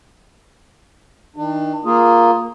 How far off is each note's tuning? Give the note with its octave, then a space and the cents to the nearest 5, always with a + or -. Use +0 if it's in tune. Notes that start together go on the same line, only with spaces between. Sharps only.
D#3 +25 D4 +40
A#3 +0 F4 +0 G#4 +0